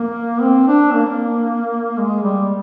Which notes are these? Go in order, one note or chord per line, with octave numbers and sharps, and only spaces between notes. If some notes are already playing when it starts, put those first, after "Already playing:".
Already playing: A#3
C4
D4
A#3
G#3
G3